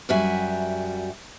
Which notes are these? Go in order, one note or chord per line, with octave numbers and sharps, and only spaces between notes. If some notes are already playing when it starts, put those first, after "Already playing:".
F#2 G3 F#4 E5 G#5